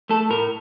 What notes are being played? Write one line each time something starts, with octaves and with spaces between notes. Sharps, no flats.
A3 A4
A2 A#4